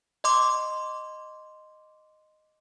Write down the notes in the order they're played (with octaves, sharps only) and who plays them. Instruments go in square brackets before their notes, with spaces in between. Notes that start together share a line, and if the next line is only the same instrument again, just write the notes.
[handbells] D#5 C6 D6